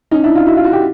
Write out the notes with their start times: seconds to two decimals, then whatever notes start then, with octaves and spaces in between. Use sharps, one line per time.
0.11 C#4 D#4
0.24 D4 E4
0.35 D#4 F4
0.46 E4 F#4
0.57 F4
0.64 F#4
0.73 G4